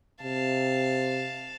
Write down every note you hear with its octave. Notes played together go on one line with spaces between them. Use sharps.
C3 F5 A5